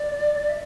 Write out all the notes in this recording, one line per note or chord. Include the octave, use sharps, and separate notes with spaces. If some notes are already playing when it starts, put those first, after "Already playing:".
Already playing: D5
E5